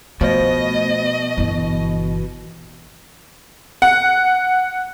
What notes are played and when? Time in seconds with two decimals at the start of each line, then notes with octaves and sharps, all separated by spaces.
0.21 B2 F3 A3 D#5
1.37 G1 E3
3.82 F#5